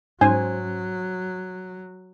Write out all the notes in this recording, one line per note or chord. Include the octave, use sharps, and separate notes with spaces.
G#2 F#3 C#4 C5 G#5